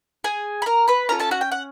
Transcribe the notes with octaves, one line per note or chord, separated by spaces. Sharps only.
G#4 G#5
B5
A#4 A#5
B4 B5
C#4 F4 A4 A#4 A#5
A4 A5
F#4 F#5
G5
F#5